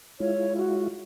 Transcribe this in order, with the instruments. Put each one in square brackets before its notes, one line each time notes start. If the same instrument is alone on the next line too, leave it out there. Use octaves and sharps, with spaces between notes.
[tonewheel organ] G#3 E4 F4 [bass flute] C#5
[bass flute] F#4